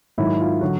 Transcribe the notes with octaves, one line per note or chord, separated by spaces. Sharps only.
G#2 D#3 F#3 E4
F4
D3 F#3 F#4